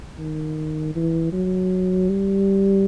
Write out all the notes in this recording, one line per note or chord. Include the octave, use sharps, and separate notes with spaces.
D#3
E3
F#3
G3